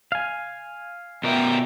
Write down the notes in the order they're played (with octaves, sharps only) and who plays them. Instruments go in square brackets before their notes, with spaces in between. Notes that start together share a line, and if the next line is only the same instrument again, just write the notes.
[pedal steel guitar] F5 G#5
[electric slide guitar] B2 A#4 [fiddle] E5 G5